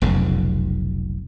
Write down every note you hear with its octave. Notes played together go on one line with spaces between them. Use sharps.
F1 B1 F2 C#3